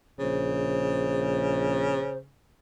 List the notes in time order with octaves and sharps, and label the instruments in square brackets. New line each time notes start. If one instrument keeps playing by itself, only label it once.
[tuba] A#1 [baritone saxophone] C#3 [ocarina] C5